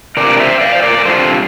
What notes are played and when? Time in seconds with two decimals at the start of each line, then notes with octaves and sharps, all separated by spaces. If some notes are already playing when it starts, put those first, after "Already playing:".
0.17 C3 G3 D4 F4 A#4 D5
0.39 C5 E5
0.61 D5 F5
0.75 C5
0.83 A#4 D5
0.98 A#4
1.05 C3 G3 D4 F4 A4 C5